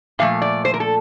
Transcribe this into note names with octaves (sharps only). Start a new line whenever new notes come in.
A#2 F3 A3 F5
D5
C5
A#4
A4